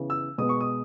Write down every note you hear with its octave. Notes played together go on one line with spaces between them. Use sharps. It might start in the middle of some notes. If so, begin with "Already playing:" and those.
Already playing: C#3 E3 B3
E6
B2 G#3 B3 D#6
C#6
D#6